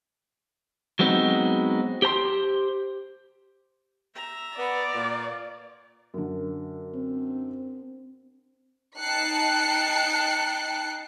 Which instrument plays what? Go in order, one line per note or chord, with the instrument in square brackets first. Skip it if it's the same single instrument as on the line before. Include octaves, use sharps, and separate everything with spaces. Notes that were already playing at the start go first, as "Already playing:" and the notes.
[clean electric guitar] F#3 G#3 B3 C4 D#4
G4 C5 A#5 C6
[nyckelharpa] E5 A#5
[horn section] B3 [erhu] D5
[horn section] A#2
[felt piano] F#2 D3
[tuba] C4
[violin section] D#4 G5 A5 F#6 C7 C#7